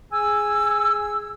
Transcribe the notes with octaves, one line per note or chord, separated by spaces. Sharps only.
G#4 G#5 E6